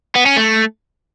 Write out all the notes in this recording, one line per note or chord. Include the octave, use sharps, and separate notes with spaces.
B3
C#4
A3